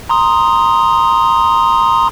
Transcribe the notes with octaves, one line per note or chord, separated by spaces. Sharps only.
A#5 C6 D#6